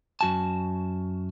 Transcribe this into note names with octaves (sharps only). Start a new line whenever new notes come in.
F#2 F#4 G#5 A5